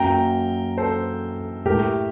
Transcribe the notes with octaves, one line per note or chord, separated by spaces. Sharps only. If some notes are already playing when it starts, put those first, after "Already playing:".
Already playing: F#2 F#3 A#3 G5 A#5
A4 C5
A2 A3 G4 A#4